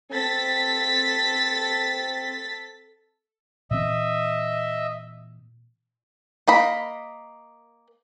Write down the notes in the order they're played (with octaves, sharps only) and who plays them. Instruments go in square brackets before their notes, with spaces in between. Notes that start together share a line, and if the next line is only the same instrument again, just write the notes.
[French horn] C4 [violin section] A4 A6 B6
[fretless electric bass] A#2 E3 C4 [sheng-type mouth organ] D#5 E5
[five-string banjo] A#3 D#5 B5